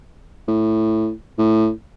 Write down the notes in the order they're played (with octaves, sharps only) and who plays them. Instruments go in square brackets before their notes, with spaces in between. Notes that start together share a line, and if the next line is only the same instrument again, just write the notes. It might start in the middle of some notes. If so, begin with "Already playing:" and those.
[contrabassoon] A2
A2